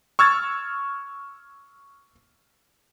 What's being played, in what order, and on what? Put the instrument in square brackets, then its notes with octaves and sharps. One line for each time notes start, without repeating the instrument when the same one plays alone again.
[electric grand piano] C#6 E6 F6 G#6 A6